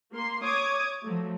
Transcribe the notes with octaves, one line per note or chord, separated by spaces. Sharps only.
A#3 C6
C#5 D6 D#6 G#6
F3 F#3 A3